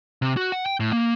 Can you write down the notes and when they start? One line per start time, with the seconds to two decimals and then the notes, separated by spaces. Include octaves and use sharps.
0.22 C3
0.37 F#4
0.52 F#5
0.66 G5
0.80 A2
0.93 A#3